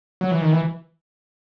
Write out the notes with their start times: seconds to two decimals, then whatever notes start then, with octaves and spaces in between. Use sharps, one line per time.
0.21 F#3
0.31 E3
0.42 D#3
0.52 E3